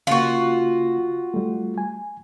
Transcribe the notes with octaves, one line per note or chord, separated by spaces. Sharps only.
C#3 A#3 F4 F#4
G3 A3
G#5